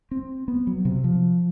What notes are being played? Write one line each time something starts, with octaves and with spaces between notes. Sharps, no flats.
C4
B3
F#3
C3
F3